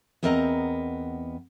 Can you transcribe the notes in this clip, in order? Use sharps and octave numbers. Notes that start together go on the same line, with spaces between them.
E2 B3 C4 A#4 D#5 A#5